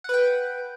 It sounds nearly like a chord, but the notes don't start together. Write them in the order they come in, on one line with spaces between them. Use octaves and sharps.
F#5 B4 G5